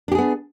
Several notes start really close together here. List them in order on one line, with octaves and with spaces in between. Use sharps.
D4 G4 G#4 B3